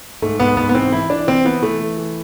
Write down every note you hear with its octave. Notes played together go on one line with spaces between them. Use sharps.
G#2 A3
G#2 B3
G#2 B3
B3
E3 C4
E3 E4
E3 D4
E3 C4
E3 B3
E3 A3
E3
E3